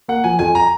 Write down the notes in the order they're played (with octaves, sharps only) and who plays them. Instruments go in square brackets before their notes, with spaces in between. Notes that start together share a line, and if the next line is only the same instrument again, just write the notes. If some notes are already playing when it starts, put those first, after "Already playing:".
[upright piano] A#3 [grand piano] F#5
[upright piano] F3 [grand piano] G#5
[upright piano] F2 [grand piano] G#5
[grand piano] A#5